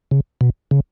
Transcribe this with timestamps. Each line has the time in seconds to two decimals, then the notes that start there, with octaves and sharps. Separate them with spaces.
0.11 C#3
0.41 B2
0.71 C#3